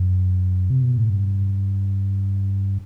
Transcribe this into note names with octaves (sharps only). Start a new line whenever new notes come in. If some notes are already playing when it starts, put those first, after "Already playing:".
Already playing: F#2
C3
B2
A2
G2